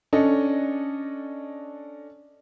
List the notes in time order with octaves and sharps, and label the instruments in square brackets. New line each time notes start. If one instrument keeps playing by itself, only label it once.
[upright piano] C#4 D4 A4 D#5